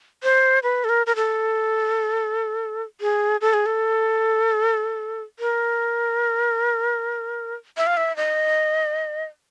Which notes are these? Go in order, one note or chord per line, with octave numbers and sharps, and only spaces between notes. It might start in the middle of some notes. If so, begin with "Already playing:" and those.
C5
B4
A4
A#4
A#4
A4
G#4
A4
G#4
A4
A#4
E5
F5
E5
D#5